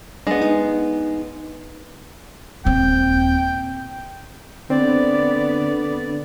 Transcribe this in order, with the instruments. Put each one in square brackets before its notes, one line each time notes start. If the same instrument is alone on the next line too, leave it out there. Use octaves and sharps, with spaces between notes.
[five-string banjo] G#3 B3 [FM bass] D4
[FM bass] D#4
[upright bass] D#1 C4 [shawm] G5
[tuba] D3 [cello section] B3 [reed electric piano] C4 [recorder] D5